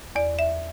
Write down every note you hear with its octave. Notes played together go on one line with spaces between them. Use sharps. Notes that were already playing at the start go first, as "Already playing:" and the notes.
E2 D5
E5